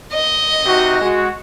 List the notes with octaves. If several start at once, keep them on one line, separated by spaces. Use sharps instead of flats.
D#5
C3 D#4 F#4
G#3 F#4